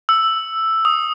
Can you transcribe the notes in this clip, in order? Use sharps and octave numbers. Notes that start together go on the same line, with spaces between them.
E6
D#6